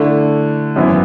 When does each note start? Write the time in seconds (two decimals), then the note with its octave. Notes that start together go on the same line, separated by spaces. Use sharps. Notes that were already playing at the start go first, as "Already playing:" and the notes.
Already playing: D3 A3 E4
0.76 G#1 F#2 E3 B3 E4